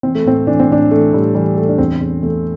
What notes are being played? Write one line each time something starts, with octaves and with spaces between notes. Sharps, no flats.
E3 C4
A3
A2 C4
E3 D4
C4
A2 D4
E3 A3
A2 G3
E3 G3
E3 A3
D4
E2 C4
E2
E2 A3